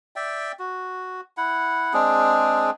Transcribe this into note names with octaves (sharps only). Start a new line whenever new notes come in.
D5 E5 G5
F#4
E4 F#5
G#3 C4 D4 G#4